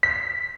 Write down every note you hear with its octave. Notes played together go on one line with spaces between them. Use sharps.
B6